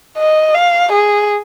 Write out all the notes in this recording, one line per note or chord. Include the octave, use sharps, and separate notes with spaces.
D#5
F5
G#4